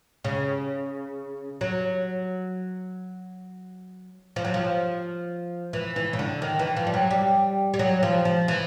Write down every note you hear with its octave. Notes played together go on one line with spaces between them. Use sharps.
C#3
F#3
F3
F#3
F3
E3
E3
C#3
D3
D#3
E3
F3
G3
F#3
G3
G3
F#3
F3
F3
E3